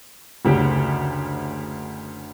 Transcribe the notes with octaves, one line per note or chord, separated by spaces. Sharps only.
F#1 D2 C#3 G4